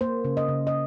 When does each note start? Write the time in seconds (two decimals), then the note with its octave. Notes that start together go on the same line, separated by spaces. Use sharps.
0.01 A#3 C5
0.24 C#3
0.37 D#5
0.48 C#3
0.67 D#5